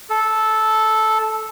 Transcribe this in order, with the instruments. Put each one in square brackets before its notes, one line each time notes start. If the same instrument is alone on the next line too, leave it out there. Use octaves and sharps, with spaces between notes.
[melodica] A4